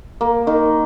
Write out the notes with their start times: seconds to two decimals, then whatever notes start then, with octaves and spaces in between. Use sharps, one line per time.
0.21 A#3
0.47 D#3